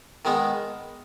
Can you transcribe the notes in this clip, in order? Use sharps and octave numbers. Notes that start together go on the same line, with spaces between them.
D#3 G#3 B3 D#4